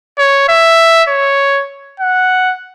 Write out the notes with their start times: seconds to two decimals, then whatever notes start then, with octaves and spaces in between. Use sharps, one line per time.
0.18 C#5
0.48 E5
1.08 C#5
2.00 F#5